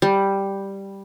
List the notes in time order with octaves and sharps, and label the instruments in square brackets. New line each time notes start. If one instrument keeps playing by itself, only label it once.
[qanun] G3